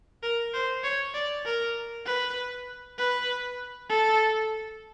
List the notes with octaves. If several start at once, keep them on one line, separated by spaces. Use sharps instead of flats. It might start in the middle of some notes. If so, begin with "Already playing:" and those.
A#4
C5
C#5
D5
A#4
B4
B4
A4